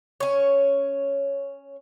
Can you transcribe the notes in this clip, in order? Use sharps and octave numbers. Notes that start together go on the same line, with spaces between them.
C#4 C#5